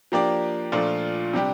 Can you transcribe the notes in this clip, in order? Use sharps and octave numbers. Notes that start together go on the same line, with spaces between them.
F3 A#3 D4 G4 D5
A#2 F3 A3 D4 F4
C3 G3 D4 G4